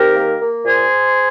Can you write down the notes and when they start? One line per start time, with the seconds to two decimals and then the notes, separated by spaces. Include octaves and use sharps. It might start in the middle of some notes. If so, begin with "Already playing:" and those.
Already playing: D#3 C4 G4 A#4
0.15 A#3
0.39 A#3
0.64 A#2 G#4 C5